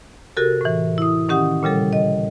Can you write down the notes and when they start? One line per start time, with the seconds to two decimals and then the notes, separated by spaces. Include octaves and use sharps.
0.37 C3 F#4 G4 A4 A#4
0.61 A2 E3
0.98 E4 D#6
1.29 D#3 C#4 G4 F#5 D#6
1.63 A#2 C#3 G3 A4
1.93 D#5